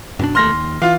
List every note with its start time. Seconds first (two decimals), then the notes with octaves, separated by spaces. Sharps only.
0.19 F#2 B2 D4
0.35 E1 D#2 A3 C6 F6 A#6
0.52 D#2
0.82 E3 F4 F5